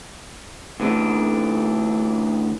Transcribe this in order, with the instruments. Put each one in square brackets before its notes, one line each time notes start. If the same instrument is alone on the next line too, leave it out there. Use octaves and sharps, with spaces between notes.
[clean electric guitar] D2 E3 D4